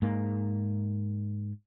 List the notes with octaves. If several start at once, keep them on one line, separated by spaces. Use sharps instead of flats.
G#2 A#3